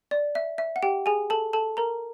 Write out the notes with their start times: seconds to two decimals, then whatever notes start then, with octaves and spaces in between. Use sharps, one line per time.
0.11 D5
0.35 E5
0.58 E5
0.76 F#5
0.83 G4 G5
1.06 G#4 G#5
1.30 A4 A5
1.53 A4 A5
1.77 A#4 A#5